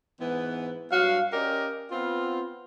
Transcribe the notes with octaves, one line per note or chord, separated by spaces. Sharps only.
G#2 E3 B3
G2 F#3 F#4 F5
C#4 G4 A#4 D5 D#5
B3 C4 F4